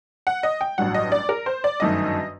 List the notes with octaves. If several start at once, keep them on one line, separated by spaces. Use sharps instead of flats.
F#5
D#5
G5
A1 G2 F#3 F#5
D#5
D5
A#4
C5
D5
G1 F#2 D#3 A3 D#5